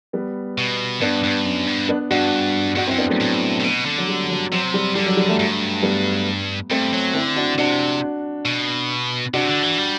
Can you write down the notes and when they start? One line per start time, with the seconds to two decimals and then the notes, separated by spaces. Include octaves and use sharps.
0.13 G3 B3
0.58 B2
1.01 G2 B3 D4
1.23 G2
1.45 F#2
1.67 G2
1.89 B3 D4
2.11 G2 D4 F#4
2.76 G2 D4 F#4
2.87 C4 E4
2.91 F#2
2.98 B3 D4
3.09 F#3 A3
3.20 A2
3.60 A2
3.64 B2
3.86 D3
3.98 F#3
4.08 G3
4.30 F#3
4.52 C3 F#3
4.74 G3
4.95 D3 G3
5.06 F#3
5.17 G3
5.29 F#3 A3
5.39 G2
5.83 G3 B3
6.70 G2 A3 C4
6.93 F#3
7.14 D3 C4 E4
7.36 D4 F#4
7.58 C3 D4 F#4
8.45 B2
9.33 C3 D4 F#4
9.47 D3
9.63 E3
9.78 G3